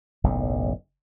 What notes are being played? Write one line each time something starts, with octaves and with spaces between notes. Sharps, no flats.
F#1 B1 A2